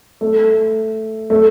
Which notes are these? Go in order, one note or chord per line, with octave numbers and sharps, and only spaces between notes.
A3
A3